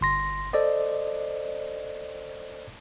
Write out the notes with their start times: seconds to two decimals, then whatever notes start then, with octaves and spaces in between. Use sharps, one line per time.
0.01 G1 C6 A#6
0.53 A4 C5 D5 D#5